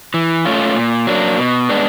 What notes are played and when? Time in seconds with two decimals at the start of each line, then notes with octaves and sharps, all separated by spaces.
0.14 E3
0.45 A3 C#4 F4
0.76 A#2
1.07 F#3 A#3 D4
1.38 B2
1.69 G#3 B3 D4